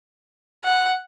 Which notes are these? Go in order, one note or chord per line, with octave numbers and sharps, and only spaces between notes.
F#5